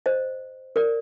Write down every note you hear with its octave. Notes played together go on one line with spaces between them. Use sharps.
C5 D#5
A#4 D5